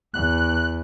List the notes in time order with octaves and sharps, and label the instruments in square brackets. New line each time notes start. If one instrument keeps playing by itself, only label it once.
[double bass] E2 [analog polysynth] F#6